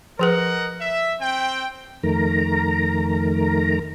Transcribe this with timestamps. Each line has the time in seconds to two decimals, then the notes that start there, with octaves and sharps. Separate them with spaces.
0.19 F3 G#4 A#4 B4 D#5 F#5
0.80 E5
1.21 C4 G5
2.03 F2 D#3 A3 A#4 A#5